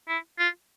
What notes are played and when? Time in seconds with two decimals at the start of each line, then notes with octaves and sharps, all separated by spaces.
0.08 E4
0.39 F4